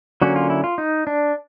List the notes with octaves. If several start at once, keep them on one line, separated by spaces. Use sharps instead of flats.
D3 F#3 A#3 C#4 F#4
F4
E4
F4
D#4
D4